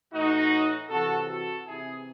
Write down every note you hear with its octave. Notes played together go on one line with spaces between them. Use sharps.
A2 E3 D#4 F#4
C3 E3 F#4 A4
F#4 A4
C3 E3 E4 G#4